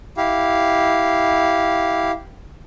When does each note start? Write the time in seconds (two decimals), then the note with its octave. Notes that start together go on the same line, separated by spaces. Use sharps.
0.17 E4 G4 F5